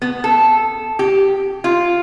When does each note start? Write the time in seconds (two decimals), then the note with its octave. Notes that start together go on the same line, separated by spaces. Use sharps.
0.02 B3
0.24 A4
0.99 G4
1.64 F4